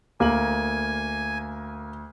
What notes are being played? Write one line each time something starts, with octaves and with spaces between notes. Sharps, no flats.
D2 A#3 G#5 F#7